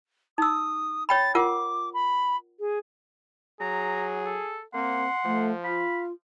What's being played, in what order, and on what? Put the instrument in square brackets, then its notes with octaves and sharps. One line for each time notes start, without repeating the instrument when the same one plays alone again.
[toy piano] D#4 E6 [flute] D#6
[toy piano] C#5 G5 B5 [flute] A6
[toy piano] F4 A#4 F#5 [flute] D6
[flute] B5
G#4
[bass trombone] F#3 [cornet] G#4 [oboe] A#5
[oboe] A4
[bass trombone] A#3 [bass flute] C4 [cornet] F#5 [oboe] C6
[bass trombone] F3 [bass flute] A3
[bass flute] F4 [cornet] F5 [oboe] B5